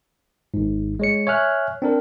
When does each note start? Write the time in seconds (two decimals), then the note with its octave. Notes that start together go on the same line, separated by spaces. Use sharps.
0.54 G#1 G#2
0.99 G#3 C#5 C#7
1.27 C#5 E5 G#5 F6 F#6
1.82 C4 D4 A#4